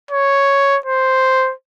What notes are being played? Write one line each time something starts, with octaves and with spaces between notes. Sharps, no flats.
C#5
C5